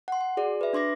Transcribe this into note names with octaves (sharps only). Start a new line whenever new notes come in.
F#5 C6
C6
F#4 G#4 D5
B4 E5
D4 C6 D6 A#6